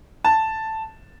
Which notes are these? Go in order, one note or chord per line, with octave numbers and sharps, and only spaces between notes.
A5